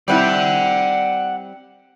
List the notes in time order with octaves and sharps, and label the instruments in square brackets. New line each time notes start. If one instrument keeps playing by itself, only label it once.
[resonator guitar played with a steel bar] G3 C4 E4 [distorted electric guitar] D5 F#5